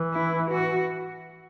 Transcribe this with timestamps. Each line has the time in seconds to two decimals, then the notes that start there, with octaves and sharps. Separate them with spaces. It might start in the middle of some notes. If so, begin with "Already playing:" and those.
Already playing: E3
0.13 E4
0.51 F#4